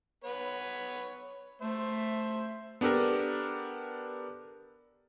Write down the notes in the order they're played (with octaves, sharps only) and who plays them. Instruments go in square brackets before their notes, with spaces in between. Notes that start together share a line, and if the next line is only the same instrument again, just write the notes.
[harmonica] B3 B4 C#5
[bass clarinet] A3 [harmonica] C5 E5
[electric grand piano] B3 D4 G4 A4 A#4